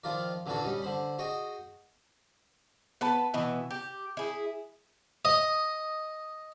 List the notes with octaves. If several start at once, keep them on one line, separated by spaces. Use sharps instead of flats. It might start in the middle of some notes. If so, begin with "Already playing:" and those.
D#3 F3 F4 A#4 D5
A#2 D3 E3 D4 F#4 A4
G3 C#4 D#4
D3 C5 B5
F#4 G#4 D#5 G5
B3 B4 A5
B2 E3 B3 E5
G4
E4 G#4
D#5